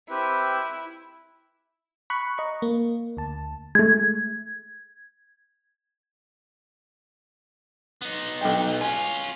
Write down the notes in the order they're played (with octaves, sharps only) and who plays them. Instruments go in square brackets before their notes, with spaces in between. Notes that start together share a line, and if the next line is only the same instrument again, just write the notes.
[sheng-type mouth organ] C4 G4 B4 [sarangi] E4
[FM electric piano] B5 C#6 F#6
D#5 A#5 C#6
A#3
D2 A5
[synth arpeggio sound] G#3 A3 [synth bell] G#6
[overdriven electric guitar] B3 D#4
[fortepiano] B1 G5
[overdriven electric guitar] C#4 F4 [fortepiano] G#5